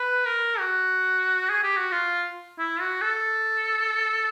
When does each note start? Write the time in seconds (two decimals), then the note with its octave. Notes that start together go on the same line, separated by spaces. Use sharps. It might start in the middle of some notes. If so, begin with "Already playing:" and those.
Already playing: B4
0.25 A#4
0.59 F#4
1.49 G#4
1.64 G4
1.77 F#4
1.92 F4
2.59 E4
2.81 F#4
3.02 A4